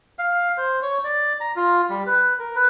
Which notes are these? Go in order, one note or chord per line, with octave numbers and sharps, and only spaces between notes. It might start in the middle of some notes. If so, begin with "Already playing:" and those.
F5
C5
C#5
D5
A#5
F4
G3
B4
A#4
B4